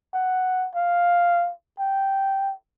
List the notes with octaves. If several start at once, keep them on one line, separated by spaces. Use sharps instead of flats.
F#5
F5
G5